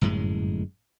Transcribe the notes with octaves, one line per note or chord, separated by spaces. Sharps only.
G1 F#2 A2 G#3